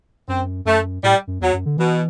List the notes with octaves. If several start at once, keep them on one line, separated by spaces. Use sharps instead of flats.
F#2 C4
F#2 A3
A2 G3
F#2
E2 F#3
F#2
D3
B2 E3